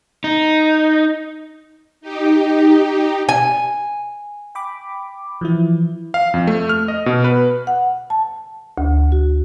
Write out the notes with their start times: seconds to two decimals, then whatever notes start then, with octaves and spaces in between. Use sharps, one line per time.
0.24 D#4
2.01 D#4 G4
3.29 G#5
4.55 G5 B5 D6
5.41 E3 F3 E4
6.14 F5
6.34 F2
6.47 A3
6.69 F6
6.88 D#5
7.06 B2
7.24 B4
7.67 F#5
8.10 A5
8.78 D2
9.12 F#4